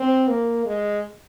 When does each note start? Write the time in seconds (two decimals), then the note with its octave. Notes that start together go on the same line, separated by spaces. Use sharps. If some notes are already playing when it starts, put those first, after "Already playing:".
Already playing: C4
0.28 A#3
0.66 G#3